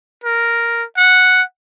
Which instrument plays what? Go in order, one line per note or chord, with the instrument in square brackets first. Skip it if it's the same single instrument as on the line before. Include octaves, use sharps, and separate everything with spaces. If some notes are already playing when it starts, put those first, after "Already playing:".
[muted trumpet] A#4
F#5